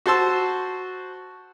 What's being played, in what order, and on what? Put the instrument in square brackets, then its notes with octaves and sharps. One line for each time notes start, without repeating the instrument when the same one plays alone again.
[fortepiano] F#4 C5 A5 C6 E6